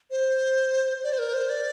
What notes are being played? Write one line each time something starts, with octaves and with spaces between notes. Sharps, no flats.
C5
D5
C5
A#4
C5
D5